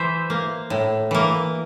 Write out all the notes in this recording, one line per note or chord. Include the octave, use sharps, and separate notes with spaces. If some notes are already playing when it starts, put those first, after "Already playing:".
Already playing: E3 C5 E5
A#3
A2
E3 A#3